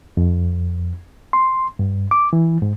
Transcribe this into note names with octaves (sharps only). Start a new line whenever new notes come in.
F2
C6
G2
D6
E3
G#2